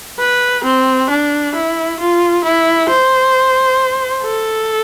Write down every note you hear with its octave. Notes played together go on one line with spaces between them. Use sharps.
B4
C4
D4
E4
F4
E4
C5
A4